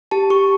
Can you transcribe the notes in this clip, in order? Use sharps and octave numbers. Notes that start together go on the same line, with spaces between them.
G4 A5
G4 C#6